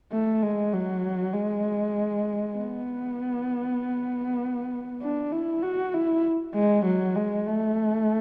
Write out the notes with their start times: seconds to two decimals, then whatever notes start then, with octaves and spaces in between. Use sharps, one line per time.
0.12 A3
0.42 G#3
0.73 F#3
1.34 G#3
2.57 B3
5.02 D4
5.32 E4
5.63 F#4
5.94 E4
6.55 G#3
6.86 F#3
7.16 G#3
7.47 A3